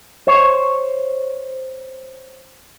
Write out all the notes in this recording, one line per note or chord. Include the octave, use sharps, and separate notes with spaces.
C5 C#5